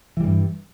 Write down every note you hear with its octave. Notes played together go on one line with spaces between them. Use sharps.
G2 E3 G3